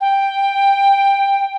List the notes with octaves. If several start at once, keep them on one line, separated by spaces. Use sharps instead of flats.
G5